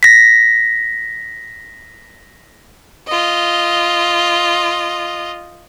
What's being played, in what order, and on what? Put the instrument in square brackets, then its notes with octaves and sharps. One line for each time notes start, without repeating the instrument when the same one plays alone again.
[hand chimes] A#6 B6
[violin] F4 D#5